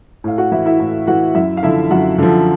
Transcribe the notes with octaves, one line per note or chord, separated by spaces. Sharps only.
A2 F5
F#4 F#5
E3 E4 E5
E4 E5
A2
E3 F#4 F#5
F#2 E4 E5
F5
D3 F3 E4 E5
F#2 F#4 F#5
D3 F3